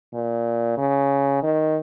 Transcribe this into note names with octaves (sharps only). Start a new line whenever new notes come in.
A#2
C#3
D#3